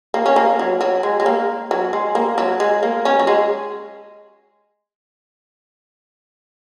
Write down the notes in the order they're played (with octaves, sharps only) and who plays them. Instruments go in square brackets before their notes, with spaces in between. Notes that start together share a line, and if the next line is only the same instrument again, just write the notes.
[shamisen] A#3
C#4
A#3
F#3
F#3
G#3
G#3
A#3
F#3
G#3
A#3
F#3
G#3
A#3
C#4
F#3
G#3